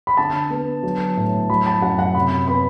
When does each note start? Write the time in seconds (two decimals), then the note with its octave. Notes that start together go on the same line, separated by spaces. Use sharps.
0.07 B5
0.17 D3 A5
0.50 B3
0.83 F#3
1.17 A2
1.50 F#3 B5
1.66 A5
1.82 F#2 F#5
1.99 F#5
2.15 C3 B5
2.48 B3 B5